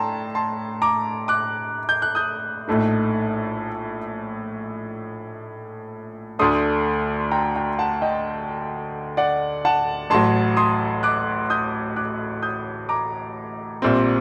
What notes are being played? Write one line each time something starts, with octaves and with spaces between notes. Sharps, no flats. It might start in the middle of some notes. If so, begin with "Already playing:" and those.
Already playing: A2 D4 G5 A5 A#5 C6
A5 C6
A#5 D6
D6 F#6
G6
F#6
D#6 G6
A#1 A2 A3 D#4
D2 D3 A3 D4 C6 D#6
G5 A#5
G5 A#5
F#5 A5
D#5 G5
D5 F#5
F#5 A5
A1 A2 F#3 A5 C6
C6 D#6
D6 F#6
D#6 G6
D6 F#6
D#6 G6
A#5 D6
A#1 A#2 G3 C4